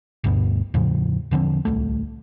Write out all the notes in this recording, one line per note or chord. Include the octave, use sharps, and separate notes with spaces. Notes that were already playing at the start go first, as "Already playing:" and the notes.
G1 D2 G2 B2
E2 A2 C#3 F3
E1 D3 F3 C4
D1 C2 A3